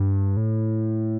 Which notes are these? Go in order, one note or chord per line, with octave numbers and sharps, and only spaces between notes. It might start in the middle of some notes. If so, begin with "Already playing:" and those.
Already playing: G2
A2